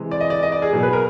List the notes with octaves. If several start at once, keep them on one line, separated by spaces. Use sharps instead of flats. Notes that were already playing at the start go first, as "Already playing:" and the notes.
Already playing: C3 E3 G#3
D5
D#5
D5
D#5
D5
G#4
B2 F#3
B4
A#4